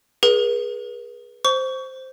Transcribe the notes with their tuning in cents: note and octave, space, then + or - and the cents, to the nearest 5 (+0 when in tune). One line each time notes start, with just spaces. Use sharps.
G#4 +0 B4 -40
C5 +0 C#6 +30